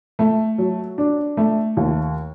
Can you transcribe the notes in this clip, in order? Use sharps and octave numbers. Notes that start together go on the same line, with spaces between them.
A3
F#3
D4
A3
D#2